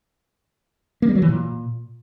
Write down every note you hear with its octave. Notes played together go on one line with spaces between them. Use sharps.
A#3
G3
F#3
E3
A#2